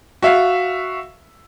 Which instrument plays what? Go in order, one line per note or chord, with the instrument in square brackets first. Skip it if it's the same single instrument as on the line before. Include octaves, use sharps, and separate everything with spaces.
[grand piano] F#4 E5 F5